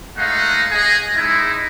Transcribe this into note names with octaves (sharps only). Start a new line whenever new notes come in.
G#3 A3 D#4 D#5 F5 F#5
G#4 D#5
G#3 D#4 E4